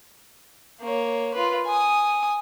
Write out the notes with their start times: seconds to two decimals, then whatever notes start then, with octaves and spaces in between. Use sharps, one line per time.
0.81 A#3 C#5
1.34 F4 B4
1.66 G#5 D#6